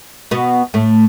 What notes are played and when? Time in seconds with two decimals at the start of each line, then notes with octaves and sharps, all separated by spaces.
0.31 B2 B3
0.74 A2 A3